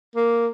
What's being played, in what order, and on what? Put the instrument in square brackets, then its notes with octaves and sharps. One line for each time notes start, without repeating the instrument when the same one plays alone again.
[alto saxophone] A#3